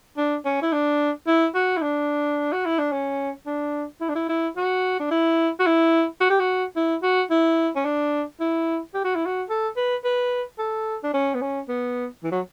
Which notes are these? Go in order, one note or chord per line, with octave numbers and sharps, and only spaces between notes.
D4
C#4
E4
D4
E4
F#4
E4
D4
F#4
E4
D4
C#4
D4
E4
D4
E4
E4
F#4
D4
E4
F#4
E4
F#4
G4
F#4
E4
F#4
E4
C#4
D4
E4
G4
F#4
E4
F#4
A4
B4
B4
A4
D4
C#4
B3
C#4
B3
E3
F#3